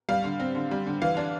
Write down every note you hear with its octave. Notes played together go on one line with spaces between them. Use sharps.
G3 F5
D3
C4
D3
G3
D3
E3 F5
D4